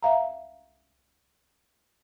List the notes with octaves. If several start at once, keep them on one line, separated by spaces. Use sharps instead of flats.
E5 F5 A#5